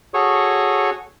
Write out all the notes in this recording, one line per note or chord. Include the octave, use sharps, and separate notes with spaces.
F#4 G#4 A4 C#5 C#6 D#6